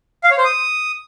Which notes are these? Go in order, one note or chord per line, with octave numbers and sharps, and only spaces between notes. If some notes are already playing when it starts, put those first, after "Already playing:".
F5
C#5
C5
D#6